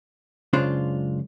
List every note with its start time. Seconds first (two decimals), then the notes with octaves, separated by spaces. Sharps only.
0.53 C#2 F#2 C#3 D4 F4 C5